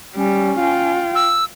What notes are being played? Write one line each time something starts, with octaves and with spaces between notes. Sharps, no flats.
G3 C#4
F4 G5
E6